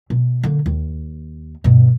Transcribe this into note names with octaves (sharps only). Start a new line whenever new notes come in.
B2
D3 A#3
D#2
G2 B2